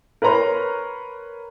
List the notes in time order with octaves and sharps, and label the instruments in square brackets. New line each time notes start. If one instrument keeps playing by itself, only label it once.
[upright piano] A#4 B4 C#5 A#5 C6